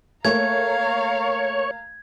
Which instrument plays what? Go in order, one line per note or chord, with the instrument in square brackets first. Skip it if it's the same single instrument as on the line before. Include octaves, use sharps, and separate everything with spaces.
[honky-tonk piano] A3 A#3 [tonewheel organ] C#5 [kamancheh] F5 A#5 [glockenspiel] G#6